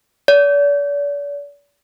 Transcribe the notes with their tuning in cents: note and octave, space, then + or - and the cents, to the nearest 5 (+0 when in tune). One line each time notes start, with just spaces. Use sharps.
D5 -40